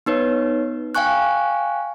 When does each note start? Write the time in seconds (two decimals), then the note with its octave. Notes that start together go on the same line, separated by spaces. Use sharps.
0.06 B3 D#4 B4 C#5
0.95 F5 G5 G#5 C#6 F#6